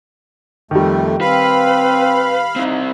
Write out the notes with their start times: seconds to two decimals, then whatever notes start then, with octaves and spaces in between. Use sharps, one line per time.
0.71 F2 D#3 G3 A3
1.21 C4 B4 F5 B5
2.56 C4 D#4 E4